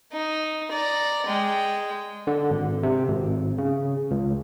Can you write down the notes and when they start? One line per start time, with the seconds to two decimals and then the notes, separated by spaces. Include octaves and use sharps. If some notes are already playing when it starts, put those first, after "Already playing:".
0.12 D#4
0.70 D5 A#5
1.27 G#3 G5
2.27 D3
2.50 G#1
2.83 C3
3.08 G#1
3.58 C#3
4.11 C#2